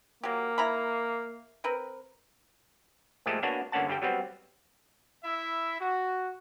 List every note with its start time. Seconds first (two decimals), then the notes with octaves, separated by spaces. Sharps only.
0.23 F#3 A#3 G4
0.58 E4 A#5 B5
1.64 C4 A#4 B4
3.26 A#2 F3 G#3 A3 G4 A4
3.43 A#3 B3 D4 F#4 C#5 G#5
3.72 G1 D3 A#3 C#4 F#5 A5
3.88 G2 D3 G3 G5
4.02 F#3 G3 B3 C4
5.24 E4 E5
5.79 F#4